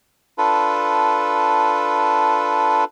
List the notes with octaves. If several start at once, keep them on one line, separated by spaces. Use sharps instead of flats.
D4 F4 A4 B4